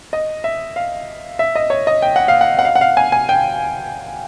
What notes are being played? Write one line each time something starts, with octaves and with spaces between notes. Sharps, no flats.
D#5
E5
F5
E5
D#5
C#5
D#5
G5
F#5
F5
F#5
F#5
F5
F#5
F5
G#5
G#5
G5